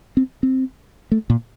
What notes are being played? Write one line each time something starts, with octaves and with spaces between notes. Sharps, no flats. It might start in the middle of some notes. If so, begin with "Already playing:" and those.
C4
C4
A3
A#2